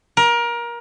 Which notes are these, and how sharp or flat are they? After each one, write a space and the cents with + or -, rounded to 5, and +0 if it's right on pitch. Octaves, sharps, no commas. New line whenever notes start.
A#4 +25